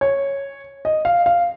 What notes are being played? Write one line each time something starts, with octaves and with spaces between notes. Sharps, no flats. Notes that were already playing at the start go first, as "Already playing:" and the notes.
C#5
D#5
F5
F5